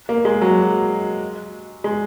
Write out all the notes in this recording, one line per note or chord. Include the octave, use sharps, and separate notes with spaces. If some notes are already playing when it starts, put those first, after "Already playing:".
A#3
G#3
F#3
G#3